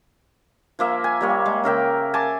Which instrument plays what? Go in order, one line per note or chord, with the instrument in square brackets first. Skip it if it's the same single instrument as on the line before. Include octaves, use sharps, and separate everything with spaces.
[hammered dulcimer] F3 A#3 E5
G#5
G3 A#3 C#5
G#3
C#3 A#4 E5 G5
G#5 A5 C6 D6